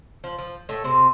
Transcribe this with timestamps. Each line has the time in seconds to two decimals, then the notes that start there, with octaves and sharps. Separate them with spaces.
0.24 F3
0.38 F3
0.69 A2 A3
0.84 C3 C4